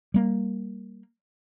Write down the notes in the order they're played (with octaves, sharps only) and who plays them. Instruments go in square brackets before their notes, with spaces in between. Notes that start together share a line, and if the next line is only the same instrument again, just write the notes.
[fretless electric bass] G3 A#3